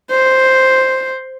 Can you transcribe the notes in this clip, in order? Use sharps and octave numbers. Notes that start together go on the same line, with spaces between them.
C5